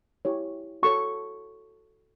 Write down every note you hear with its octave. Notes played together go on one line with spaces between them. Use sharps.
E4 G4 C#5
F#4 A4 C#5 C#6